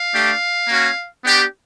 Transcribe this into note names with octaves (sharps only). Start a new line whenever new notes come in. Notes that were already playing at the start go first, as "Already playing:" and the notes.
Already playing: F5
A3 D4 G4
A#3 C#4 F#4
B3 D4 G4